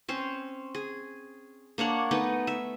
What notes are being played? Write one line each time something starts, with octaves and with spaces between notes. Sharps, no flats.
C4 C#4 C5
G#4
A#3 D4 C#5 F#5
A3 B3 D#4 D#5
E5